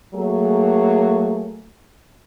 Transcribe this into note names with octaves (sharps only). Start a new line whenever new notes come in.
F#3 A3 A#3 G#4